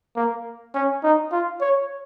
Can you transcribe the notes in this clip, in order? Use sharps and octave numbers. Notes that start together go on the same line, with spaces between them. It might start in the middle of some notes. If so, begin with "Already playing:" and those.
A#3
C#4
D#4
F4
C#5